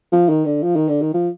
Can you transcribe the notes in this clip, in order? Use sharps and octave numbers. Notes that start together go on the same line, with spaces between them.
F3
D#3
D3
F3
D#3
D3
D#3
F3